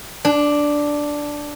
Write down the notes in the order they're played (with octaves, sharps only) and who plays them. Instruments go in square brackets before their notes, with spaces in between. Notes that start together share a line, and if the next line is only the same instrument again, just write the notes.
[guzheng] D4